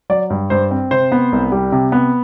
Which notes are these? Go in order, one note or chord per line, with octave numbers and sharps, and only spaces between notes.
F#3 D5
G2
G2 C5
C4
C3 C5
B3
C2
G3
C3
B3